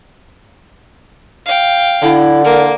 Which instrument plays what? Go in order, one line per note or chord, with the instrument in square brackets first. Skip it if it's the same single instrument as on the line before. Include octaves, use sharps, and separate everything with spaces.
[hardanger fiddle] F5 G5
[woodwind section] D3 [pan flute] E4
[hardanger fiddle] A#3 [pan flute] A#4